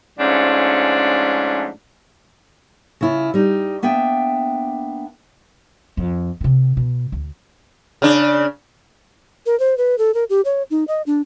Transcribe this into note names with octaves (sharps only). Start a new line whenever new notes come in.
G#2 F3 A3 C#4 D4
C#3 E4 F4
G3 D#4
A#3 B3 D4 E5 G5
F2
C3 D#3
B2
D2
C#3 D4
A#4
C5
B4
A4
A#4
G4
C#5
D#4
D#5
D4